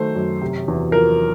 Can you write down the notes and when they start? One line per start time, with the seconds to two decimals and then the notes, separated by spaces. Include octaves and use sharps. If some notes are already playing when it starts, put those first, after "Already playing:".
Already playing: D#3 F#3 A3 C5
0.16 F#2
0.41 C3
0.68 E2
0.92 F3 A#4